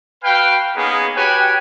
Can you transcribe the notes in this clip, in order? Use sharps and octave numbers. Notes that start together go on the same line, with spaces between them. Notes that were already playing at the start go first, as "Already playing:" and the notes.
F#4 B4 F5 G5
A#3 B3 C#4 D#4 G#4
F#4 G4 B4 C#5 G5 G#5